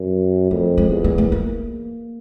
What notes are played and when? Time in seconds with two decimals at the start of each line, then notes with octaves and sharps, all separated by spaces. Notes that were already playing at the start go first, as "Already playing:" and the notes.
Already playing: F#2
0.51 F2 A3
0.78 G#3
0.91 E2
1.04 A#3
1.18 A3
1.32 A#3